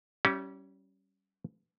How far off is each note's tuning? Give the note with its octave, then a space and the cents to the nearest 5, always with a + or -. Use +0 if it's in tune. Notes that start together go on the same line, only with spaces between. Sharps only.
G3 -25 C#4 +0 E4 +0